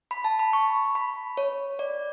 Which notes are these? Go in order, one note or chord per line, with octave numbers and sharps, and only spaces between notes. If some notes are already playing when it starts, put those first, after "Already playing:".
B5
A5
B5
C#6
B5
C#5
D5